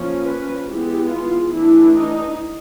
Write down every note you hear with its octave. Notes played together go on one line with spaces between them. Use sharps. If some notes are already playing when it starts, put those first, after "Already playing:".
Already playing: F3 A#3 C#4
B4
E3 G#3 B3 G4
F4
E3 A3 D4 E4
D#4